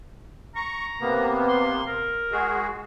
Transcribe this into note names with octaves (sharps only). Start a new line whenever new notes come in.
A#5 C#6
C3 A#3 B3
C6
A#4
G#3 F#4 G#4